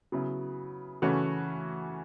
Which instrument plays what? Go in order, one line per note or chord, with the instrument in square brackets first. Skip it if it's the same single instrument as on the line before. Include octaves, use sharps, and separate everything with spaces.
[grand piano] C#3 F#3 B3 E4
C#3 E3 A3 C#4 F#4